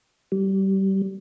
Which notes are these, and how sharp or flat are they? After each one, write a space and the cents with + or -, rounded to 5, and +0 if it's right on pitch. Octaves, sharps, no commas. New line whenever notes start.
G3 -25